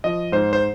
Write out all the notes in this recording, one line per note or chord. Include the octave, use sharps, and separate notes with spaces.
F3 D#5
G#2 C5
C5